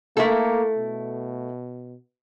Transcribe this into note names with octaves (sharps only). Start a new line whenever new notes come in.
A3 A#3 E4 A4
B2